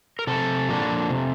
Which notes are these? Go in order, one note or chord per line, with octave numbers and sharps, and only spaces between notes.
A#4
C3 A4
F3 A#3 D4
C3